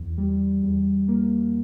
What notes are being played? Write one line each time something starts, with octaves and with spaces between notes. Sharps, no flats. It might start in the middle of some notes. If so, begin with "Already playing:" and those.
Already playing: E2
G3
E2
A#3